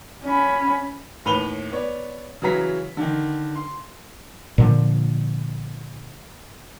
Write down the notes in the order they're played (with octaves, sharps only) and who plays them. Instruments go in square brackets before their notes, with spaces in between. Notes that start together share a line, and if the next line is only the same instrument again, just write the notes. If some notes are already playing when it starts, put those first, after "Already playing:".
[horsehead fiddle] C#4 B5
[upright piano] D#2 A2 B4 B5 F7 G7
B3 C#5 D5
C#3 E3 F#3 A#5 B6
D3 D#3
C6
[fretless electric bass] A#2 D3 F3